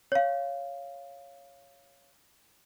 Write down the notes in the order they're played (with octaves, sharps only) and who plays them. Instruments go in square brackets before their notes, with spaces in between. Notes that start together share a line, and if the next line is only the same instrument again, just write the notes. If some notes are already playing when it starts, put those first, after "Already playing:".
[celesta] C#5 F5